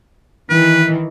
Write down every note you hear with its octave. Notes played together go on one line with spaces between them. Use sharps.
D#3 E3 B4